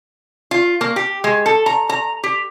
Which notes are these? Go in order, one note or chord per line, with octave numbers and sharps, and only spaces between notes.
F4
A#3
G4
G#3
A4
A#5
A#5
G4